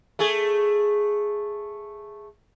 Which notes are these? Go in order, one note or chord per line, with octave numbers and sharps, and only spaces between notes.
A3 G#4